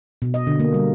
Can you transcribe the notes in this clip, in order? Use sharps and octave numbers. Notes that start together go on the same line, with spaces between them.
B2
D#5
D3
A#3
G3